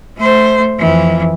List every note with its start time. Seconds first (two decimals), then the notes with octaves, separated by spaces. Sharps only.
0.17 A3 C5
0.79 F2 E3